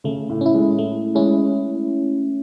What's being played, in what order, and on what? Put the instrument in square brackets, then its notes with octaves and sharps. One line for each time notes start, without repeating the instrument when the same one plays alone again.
[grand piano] C#3 [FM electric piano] A3
[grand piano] A2
[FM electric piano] C#4 E4
[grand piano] G#3
[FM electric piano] A3
[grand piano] G#3 [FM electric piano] C#4 E4